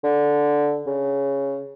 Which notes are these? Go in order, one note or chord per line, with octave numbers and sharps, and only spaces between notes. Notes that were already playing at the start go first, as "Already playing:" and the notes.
D3
C#3